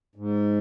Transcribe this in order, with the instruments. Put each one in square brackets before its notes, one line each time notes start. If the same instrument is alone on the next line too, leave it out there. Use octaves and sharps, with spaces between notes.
[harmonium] G#2